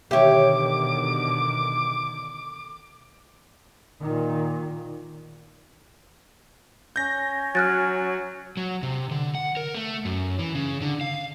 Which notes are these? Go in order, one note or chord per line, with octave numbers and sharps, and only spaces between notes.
B2 D3 D#3 G4 C#5 E5 D6
A#2 D#3
C#4 G6 A#6
F#3 F6 F#6 A6
F#3
C3
D3
F#5
A#4
A3
F#2
E3
C#3
D3
F5